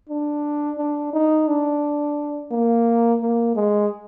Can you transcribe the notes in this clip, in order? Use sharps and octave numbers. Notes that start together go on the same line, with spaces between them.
D4
D4
D#4
D4
A#3
A#3
G#3